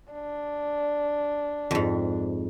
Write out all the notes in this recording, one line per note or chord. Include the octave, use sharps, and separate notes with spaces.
D4
F2 G#2